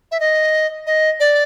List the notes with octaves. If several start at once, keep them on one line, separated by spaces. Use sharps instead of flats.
E5
D#5
D#5
D5